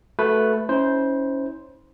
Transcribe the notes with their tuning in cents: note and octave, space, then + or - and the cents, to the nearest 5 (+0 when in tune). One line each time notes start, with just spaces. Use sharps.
A3 +0 F#4 +0 B4 +0
C#4 +0 E4 -40 C5 +0